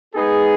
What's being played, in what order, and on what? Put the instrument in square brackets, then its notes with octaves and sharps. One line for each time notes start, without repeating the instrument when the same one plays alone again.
[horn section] G#3 B3 D#4 G#4